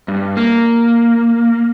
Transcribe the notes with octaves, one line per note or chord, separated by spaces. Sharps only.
G2
A#3